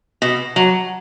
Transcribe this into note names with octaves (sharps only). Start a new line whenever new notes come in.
B2
F#3